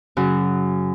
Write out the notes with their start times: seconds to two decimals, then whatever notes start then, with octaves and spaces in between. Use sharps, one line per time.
0.17 F#2 C#3 F#3 F#5